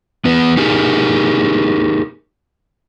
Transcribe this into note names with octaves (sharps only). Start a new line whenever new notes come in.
E3 B3 B4
D#4 G4 G#4 A#4